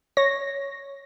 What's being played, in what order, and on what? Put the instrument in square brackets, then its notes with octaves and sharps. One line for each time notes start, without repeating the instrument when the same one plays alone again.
[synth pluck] C#5 A#6